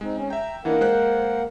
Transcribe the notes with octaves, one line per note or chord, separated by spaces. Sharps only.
G#3 C4 D#4
C#4
E5 G5 A#5
E3 A#3 D4 D#4 A#4 F#5
G#3 C5 F#6